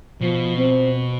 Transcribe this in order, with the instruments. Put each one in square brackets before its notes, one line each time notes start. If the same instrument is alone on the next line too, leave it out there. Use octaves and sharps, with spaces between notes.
[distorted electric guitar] B2 [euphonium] F3
[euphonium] C4